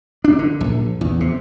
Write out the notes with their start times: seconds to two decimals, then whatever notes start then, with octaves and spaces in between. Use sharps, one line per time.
0.24 D4
0.39 D3
0.61 A#1
1.01 E2
1.20 C3